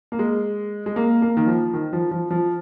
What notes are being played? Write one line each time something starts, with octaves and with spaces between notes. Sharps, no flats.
A#3
G#3
G#3
A#3
A#3
D#3
F3
D#3
F3
F3
F3